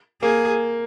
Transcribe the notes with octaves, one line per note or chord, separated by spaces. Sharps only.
A#3 G#4